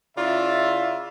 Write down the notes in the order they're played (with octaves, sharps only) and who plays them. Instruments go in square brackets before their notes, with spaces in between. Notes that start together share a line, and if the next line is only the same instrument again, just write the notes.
[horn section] C#3 E4 F4 D5 E5